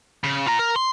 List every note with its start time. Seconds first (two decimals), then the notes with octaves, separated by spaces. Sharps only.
0.24 C#3
0.47 F4 A#5
0.59 A#4
0.76 C6